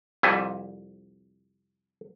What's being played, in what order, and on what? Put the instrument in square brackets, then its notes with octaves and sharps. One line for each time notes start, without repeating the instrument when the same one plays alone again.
[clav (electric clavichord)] C2 F2 G3 E5 G#5